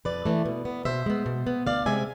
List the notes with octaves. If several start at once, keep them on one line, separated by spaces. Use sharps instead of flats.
F2 B4 D5
E3 A3
B2
B3
B2 C5 E5
G#3 B3
B2
B3
D2 D5 F5
C3 G#3 C4 E5 G#5